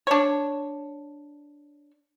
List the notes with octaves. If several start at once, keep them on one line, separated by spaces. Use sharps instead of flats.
D4 C#5